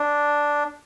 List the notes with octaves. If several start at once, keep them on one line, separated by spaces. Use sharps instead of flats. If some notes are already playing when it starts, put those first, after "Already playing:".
Already playing: D4